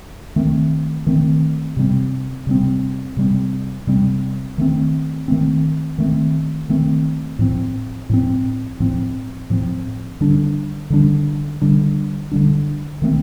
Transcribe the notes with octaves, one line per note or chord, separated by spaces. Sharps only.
D#3 A3 C4
D#3 A3 C4
C3 G3 C4
C3 G3 C4
C3 G3 C4
C3 G3 C4
D#3 A3 C4
D#3 A3 C4
D#3 A3 C4
D#3 A3 C4
A2 F3 C4
A2 F3 C4
A2 F3 C4
A2 F3 C4
D3 G3 D4
D3 G3 D4
D3 G3 D4
D3 G3 D4
D#3 A3 C4